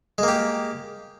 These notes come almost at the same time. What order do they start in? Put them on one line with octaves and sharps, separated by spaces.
G#3 A#3 G4